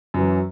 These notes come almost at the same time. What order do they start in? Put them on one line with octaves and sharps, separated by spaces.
F#2 E3 F#3